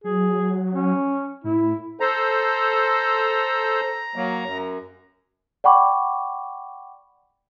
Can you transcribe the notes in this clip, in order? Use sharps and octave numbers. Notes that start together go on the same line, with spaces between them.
F#3 G#4
C#4
A2 E4
A4 C5 A#5
F#3 A#3
F#2
D5 F#5 G5 B5 C#6 D6